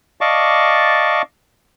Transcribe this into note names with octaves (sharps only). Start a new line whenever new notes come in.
D5 D#5 F5 A5 C#6 D6